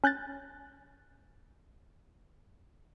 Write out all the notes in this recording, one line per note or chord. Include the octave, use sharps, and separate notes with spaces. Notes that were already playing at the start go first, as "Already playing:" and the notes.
C#4 F#6 G6 A6